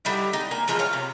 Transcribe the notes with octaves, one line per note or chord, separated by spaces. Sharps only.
D3 G3 D#4 E4
D#4
A#3 G#5 A#5
E3 F3 G#3 F4
F4 C#5 F5
C3